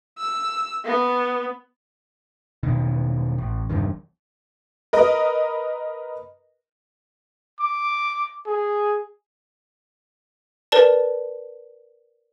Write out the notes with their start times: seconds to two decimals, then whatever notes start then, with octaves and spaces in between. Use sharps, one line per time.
0.18 E6
0.85 B3
2.63 E1 B2 D#3
3.38 A1
3.70 F1 E2 G2 D#3
4.93 A#4 B4 D#5
7.60 D6
8.46 G#4
10.72 A#4 B4 D5 A5